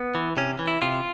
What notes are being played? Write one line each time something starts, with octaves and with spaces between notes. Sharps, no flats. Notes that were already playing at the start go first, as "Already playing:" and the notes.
Already playing: B3
E3
C3 C#4
E3
E4
C3 F4